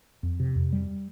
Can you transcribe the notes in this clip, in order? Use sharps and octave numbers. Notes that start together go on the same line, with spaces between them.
F2
C3
F2
G3